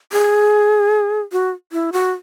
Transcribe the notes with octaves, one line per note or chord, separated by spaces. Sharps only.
G#4
F#4
E4
F#4